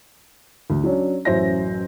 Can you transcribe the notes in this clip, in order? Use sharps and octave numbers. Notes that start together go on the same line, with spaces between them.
D2
F#3 C#4 D4
A1 F#2 F#3 C5 E5 A#6